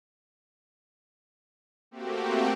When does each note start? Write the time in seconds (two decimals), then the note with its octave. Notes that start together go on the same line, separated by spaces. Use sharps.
1.91 A3 A#3 C4 F#4 G4